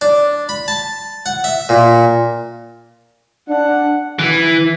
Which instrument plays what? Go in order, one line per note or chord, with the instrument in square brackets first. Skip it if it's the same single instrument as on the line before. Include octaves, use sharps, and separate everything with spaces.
[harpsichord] D4
B5
A5
F#5
E5
A#2
[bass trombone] D4 [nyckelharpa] F#5
[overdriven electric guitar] E3